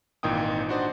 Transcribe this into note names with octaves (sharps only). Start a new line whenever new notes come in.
G#1 A#2 E3 D#4 G5 D#6
D4 D#4 F#4 C5 D5